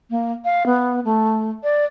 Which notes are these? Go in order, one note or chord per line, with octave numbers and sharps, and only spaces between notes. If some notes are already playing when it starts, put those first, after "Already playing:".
A#3
F5
B3
A3
D5